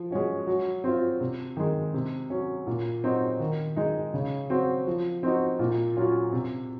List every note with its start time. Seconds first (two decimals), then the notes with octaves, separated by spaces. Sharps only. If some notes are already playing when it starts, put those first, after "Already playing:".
Already playing: F3
0.11 G#3 C#4 F#4
0.47 F#3
0.84 C4 F4
1.21 C3
1.57 D#3 G#3
1.94 C3
2.30 F#3 C#4
2.67 A#2
3.04 F#3 C4 D#4 F#4
3.40 D#3
3.76 G#3 D#4
4.14 C#3
4.50 F#3 C4 F#4
4.87 F3
5.23 C4 D#4 F#4
5.59 A#2
5.97 F#3 C#4 F4
6.33 C3